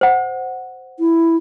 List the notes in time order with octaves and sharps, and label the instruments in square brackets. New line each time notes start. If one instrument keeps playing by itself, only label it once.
[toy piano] C5 F#5
[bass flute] E4